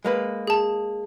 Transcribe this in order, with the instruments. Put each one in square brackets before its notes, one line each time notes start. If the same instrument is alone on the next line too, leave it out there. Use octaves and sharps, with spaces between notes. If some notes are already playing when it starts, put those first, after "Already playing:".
[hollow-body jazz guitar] G#3 A#3 B4
[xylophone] G#4 A5